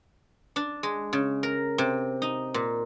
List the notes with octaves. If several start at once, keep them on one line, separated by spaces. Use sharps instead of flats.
D4
G#3
C#3
A#4
C3
D#4
A#2